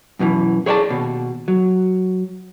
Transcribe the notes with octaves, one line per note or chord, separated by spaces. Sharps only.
F#2 B2 D3 E3
G#4 C#5 D5 F#5 A5
D#2 B2
F#3